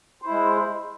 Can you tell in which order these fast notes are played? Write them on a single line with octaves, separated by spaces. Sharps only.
C5 E4 G#3